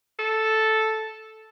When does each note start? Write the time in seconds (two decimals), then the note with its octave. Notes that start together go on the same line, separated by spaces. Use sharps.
0.19 A4